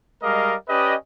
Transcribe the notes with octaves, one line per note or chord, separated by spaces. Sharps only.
G3 G#3 A#4 D#5 F5 D6
C#4 G4 B4 D5 D#5